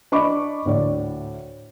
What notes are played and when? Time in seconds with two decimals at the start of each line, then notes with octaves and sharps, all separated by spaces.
0.12 D4 D#5 B5 C#6 D6
0.66 D2 A2 D5